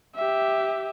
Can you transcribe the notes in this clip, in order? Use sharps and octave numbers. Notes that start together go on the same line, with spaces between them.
G4 E5